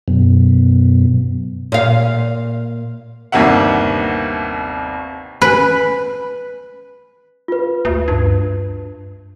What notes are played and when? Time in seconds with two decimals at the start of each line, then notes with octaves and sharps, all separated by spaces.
0.08 F#2 B2
1.72 A#2 F5
3.32 G1 D#2 C3 A#3 E5 F#5
5.42 B4
7.48 F4 B4
7.85 D2
8.08 G2